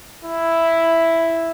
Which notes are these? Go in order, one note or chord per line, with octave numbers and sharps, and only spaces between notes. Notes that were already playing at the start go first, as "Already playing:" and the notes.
E4